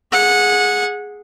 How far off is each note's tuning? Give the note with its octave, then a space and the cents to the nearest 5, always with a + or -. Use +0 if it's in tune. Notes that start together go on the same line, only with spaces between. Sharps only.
G#4 +0 F#5 -20